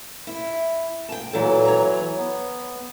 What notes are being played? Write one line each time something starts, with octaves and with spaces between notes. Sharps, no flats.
E4
G5 A5
A#2 E3 F#3 A4
C#5 A#5
B3